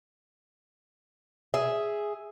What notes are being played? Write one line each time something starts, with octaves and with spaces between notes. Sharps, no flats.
G#4 E5